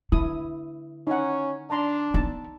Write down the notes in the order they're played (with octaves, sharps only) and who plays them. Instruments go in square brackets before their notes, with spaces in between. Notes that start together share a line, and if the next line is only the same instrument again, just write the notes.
[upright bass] D3 [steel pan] E4 D#6
[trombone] C#4 [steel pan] D#4 F#5
[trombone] D4 [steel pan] A5 A#5 C6
[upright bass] B3 [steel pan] D#4 A5